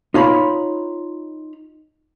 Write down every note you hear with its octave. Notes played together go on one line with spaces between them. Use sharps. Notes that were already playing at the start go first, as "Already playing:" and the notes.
D#4 F4 C#5 A#5 B5